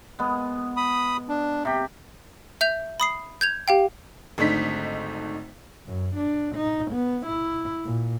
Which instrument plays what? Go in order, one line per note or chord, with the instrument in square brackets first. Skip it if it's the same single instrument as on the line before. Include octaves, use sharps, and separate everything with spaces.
[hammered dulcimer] G#3 B3
[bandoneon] B5 D#6
D4
[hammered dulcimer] C3 G4
[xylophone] E5 G6 F7
B5 D#6 C7
G6 G#6 F7
G4 F5 G5
[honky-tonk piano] G#1 D3 A3 D#4 B6
[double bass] F#2
D4
D#4
B3
E4
A#2